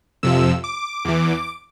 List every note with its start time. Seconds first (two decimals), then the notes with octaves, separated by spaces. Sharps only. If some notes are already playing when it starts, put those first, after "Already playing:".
0.23 F2 C3 F3 E6
0.64 D6
1.05 E2 E3